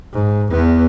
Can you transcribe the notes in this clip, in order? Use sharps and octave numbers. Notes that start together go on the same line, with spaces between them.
G#2
E2 B3